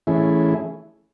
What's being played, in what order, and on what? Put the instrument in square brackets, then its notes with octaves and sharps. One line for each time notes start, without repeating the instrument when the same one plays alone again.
[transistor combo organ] E3 A3 C#4 E4 G#4